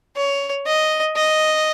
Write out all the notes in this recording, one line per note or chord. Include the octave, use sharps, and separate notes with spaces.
C#5
D#5
D#5